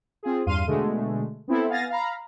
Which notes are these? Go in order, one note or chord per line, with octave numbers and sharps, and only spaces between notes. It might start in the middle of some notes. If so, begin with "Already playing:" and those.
C4 F4 G#4
E2 G2 F5 C6 D#7
B2 D3 G#3 A3
B3 C4 E4 A4
B3 F5 G#5 A6 A#6
F5 A#5 B5